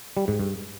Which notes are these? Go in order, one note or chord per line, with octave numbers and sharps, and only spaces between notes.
G3
G#2
G2